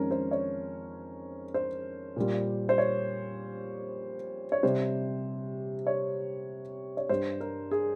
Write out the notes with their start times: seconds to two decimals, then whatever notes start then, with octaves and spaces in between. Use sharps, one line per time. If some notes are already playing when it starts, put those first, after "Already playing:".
Already playing: F2 D#3 G#3 C#4 A#4
0.11 C5
0.31 C#5
1.54 C5
2.16 A#2 G3
2.69 C5
2.78 C#5
4.52 C#5
4.63 C3 G3 C5
5.87 C#5
6.97 C#5
7.09 G2 G3 C5
7.41 A#4
7.71 G#4